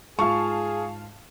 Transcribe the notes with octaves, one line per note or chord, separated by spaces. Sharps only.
G#2 F4 G#4 F5 A5 C#6